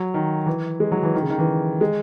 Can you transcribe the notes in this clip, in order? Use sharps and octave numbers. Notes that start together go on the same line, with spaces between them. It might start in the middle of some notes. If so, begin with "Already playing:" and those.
Already playing: F#3
D#3
E3
G#3
F#3
E3
D#3
C#3
D#3
E3
G#3